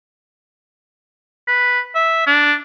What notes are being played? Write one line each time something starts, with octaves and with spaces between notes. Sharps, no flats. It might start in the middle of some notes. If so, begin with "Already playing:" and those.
B4
E5
D4